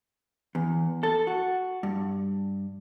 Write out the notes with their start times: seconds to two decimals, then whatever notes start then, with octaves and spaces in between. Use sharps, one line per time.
0.55 E2
1.03 A4
1.27 F#4
1.83 G2